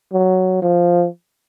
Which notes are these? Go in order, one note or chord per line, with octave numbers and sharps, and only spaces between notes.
F#3
F3